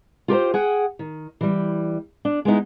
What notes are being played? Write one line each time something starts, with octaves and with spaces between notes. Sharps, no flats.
F4 G4 A#4 C5
G#4 F#5 G5
D#3
E3 G3
D4
G#3 B3 D#4 E4